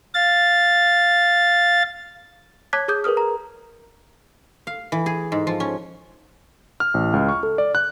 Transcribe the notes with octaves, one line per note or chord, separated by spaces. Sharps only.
F5 A6
C#5 A5 D6 F#6 G#6 B6
G#4 D6 D#6 G6
G#4 A#4 B4 D#6 F6
A#5
F5
E3
G#4
G#2
F3
C#4
F6
A1
C#2
C#6
A4
D5
F#6